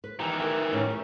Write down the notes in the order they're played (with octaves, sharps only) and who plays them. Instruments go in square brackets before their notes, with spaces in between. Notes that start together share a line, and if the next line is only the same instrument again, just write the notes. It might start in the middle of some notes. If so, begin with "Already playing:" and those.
[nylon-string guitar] B4
[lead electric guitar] D#3 E3 [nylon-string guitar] G4
[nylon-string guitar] A#4 E5
A2 C#4
G4 E5